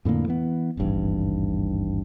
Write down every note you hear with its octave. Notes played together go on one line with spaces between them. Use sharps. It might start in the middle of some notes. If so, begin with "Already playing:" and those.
F2 A2 D3 A#3
E3 B3
D#1 G#1 G2 E3